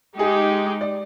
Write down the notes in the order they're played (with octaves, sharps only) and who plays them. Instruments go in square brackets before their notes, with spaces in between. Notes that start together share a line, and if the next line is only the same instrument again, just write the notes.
[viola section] G#3 D#4 G4 [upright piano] G#4
[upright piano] D5